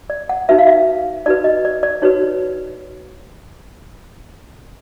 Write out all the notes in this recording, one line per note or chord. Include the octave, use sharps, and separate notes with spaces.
D5
F#5
D#4 F#4 B4 E5
F5
E5
D#4 F#4 B4 D5
D#5
D5
D5
D#4 F#4 B4 C#5